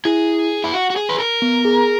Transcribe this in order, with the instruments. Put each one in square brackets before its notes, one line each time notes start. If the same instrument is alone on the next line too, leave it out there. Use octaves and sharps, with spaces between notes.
[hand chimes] E4 [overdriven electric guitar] G#4
[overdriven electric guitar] E4
F#4
F#4
G#4
B4
A#4
[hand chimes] B3
G#4